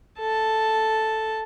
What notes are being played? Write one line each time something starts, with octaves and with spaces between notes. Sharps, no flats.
A4 A5